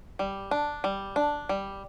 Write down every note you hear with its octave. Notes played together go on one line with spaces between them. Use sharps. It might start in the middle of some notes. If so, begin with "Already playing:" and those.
G3
D4
G3
D4
G3